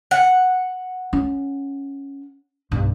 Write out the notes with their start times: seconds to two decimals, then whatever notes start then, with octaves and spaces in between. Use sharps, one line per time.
0.11 F#5
1.13 C#4
2.71 B1 G2